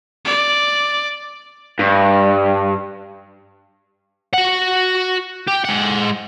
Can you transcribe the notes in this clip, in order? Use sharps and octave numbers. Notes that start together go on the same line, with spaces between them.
D5
G2
F#4 F#5
G4
G#3 F#5